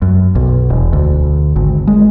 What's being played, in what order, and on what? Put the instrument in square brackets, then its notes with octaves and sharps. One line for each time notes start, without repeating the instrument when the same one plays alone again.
[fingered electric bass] F#2
B1
E1
D2
G#1
G#3